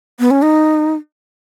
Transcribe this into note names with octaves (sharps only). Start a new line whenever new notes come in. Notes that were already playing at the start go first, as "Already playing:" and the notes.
B3
C#4
D#4